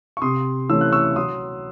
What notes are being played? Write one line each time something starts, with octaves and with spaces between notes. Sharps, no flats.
C#6
C3 C6 D#6
E3 A3 C#4 E6
F#6
C#6 E6
F#3 C6 D#6